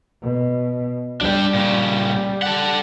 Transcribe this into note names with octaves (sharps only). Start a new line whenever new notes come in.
B2
G3 D4 G5
A#2 C#3
A4 F#5